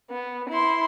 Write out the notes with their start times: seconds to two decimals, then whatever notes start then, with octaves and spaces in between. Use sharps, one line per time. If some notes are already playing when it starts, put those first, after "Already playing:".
0.10 B3
0.49 E4 C6